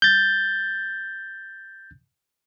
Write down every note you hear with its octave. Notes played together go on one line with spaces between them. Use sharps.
G6 A6